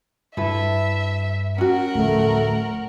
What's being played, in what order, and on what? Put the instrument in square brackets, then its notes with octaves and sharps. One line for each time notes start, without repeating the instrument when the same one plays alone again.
[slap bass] G2 [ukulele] E4 A4 B4 [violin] E5
[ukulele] C#4 F#4 [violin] A#4 F#5
[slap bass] D1 F3 [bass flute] A3